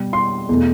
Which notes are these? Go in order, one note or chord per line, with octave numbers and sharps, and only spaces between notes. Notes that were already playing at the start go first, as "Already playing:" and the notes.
Already playing: B2 G3
C6
E2 B2 A3